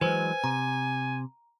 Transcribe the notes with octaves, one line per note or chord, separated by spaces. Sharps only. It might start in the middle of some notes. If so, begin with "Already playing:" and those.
E3 F#3 G#3 B4 C5 G#5
C3 A#5